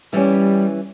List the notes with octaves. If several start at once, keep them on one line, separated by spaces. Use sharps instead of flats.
E3 G3 C#4